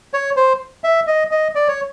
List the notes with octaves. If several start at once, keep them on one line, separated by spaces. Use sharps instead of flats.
C#5
C5
E5
D#5
D#5
D5
C#5